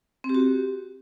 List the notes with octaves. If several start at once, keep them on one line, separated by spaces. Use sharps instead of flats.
C4
G4
F#4
G4